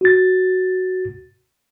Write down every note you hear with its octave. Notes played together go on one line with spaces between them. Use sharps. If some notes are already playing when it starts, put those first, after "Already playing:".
F#4 A6